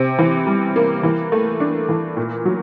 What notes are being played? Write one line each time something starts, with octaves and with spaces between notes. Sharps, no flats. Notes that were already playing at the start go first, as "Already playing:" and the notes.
Already playing: C3 C4
E3
G3
A#3
E3
A3
D4
E3
A#2
F#3